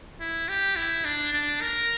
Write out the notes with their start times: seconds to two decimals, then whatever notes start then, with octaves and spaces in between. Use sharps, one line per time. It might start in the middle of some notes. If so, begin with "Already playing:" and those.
0.20 E4
0.49 G4
0.76 E4
1.05 D4
1.33 D4
1.61 A#4